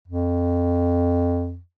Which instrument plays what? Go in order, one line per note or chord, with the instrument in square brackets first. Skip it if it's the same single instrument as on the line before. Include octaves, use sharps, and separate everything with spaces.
[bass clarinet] F2